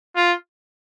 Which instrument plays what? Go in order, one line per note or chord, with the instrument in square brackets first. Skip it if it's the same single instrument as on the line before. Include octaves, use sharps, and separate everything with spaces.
[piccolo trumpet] F4